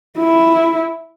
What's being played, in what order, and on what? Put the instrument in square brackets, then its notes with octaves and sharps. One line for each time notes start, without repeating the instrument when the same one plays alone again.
[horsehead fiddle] E4